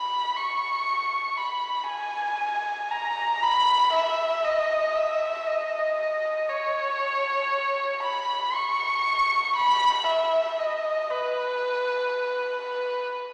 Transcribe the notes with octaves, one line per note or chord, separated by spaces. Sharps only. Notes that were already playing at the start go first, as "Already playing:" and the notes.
Already playing: B5
C#6
B5
G#5
A#5
B5
E5
D#5
E5
D#5
C#5
B5
C#6
B5
E5
D#5
B4
B4